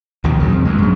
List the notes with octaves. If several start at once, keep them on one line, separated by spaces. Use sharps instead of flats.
A#1 D#2 B2 D#3
C#3 F#3
F2
D2 G#3
F#2 C#3